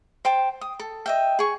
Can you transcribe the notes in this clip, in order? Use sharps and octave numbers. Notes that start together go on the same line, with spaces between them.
C5 G5 A5
D#6
A4
D#5 E5 G5
G#4 C#6